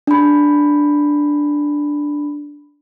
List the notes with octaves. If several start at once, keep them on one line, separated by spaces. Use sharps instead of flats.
D4 B5